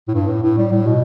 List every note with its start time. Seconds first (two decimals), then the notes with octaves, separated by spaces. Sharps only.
0.08 A2
0.14 G2
0.28 A2
0.43 A2
0.58 G3
0.72 A2
0.87 B2